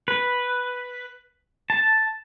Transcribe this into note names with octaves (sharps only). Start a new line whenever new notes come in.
B4
A5